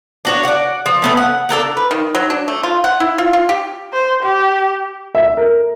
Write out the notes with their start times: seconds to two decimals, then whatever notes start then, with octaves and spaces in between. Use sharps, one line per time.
0.25 D4 F#4 C#5
0.45 D5 F#5
0.86 F3
1.02 A3 B3 C#4
1.17 F#5
1.49 D4 A4 A#4 F#5
1.77 B4
1.91 D#3
2.15 F#3
2.30 D4
2.48 A3
2.63 F4
2.84 F#5
3.00 E4
3.18 F4
3.33 F4
3.49 G4
3.93 C5
4.23 G4
5.15 E5
5.37 A#4